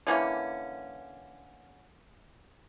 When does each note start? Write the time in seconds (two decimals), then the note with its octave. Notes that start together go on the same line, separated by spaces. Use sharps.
0.07 D3 E3 A#3 C#4